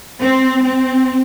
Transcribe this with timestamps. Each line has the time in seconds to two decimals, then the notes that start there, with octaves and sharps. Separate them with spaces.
0.20 C4
0.64 C4